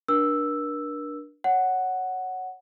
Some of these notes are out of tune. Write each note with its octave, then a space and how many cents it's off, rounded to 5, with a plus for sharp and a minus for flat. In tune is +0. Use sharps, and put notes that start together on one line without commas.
D4 +0 A#4 +40 E6 +0
C#5 +0 F#5 +0